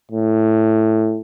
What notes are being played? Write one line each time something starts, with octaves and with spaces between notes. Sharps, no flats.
A2